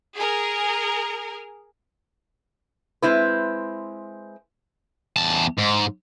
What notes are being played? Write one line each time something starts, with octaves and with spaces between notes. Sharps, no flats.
G#4 A#4
G#3 C4 E4 B4
E2 A5
G#2